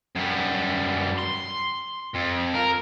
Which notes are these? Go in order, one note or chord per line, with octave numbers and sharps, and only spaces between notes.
F#2 G3
C6
F2
A#4